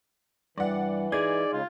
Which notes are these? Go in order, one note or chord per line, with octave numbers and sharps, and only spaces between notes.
G2 E3 D5 F#5
D#4 G#4 D5 D#5 G#6
C#3 G#3 F4